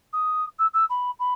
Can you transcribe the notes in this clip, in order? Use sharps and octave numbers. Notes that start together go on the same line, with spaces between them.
D#6
E6
E6
B5
B5